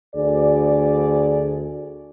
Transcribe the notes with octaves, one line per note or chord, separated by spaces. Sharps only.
D2 G#4 D5